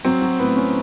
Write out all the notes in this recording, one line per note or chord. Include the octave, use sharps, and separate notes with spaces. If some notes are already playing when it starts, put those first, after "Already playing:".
F#3 C4
F#3
A2 B3
C#4